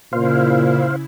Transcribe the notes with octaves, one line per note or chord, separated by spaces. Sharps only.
A#2 C#3 E4 C5 F5